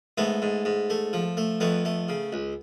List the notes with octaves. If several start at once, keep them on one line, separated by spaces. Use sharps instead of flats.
G#2 A3 B3
G#2
G#2
A3
F3
A3
F2 A3 B3
A3
C#3
C#2